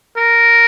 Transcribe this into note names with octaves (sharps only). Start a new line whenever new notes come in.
A#4